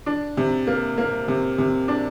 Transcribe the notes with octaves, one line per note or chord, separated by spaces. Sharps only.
D4
C3
A#3
A#3
C3
C3
D4